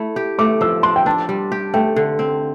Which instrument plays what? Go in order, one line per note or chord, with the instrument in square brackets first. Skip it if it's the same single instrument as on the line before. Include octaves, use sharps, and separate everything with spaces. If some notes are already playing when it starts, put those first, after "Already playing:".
Already playing: [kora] A3 E4
G4
[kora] A3 [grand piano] D6
[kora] F3 [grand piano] E6
[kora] D4 [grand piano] C6
[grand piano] G5
[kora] D4 [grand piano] A5
[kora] G3
G4
[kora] A3 [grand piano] G5
[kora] D3
C4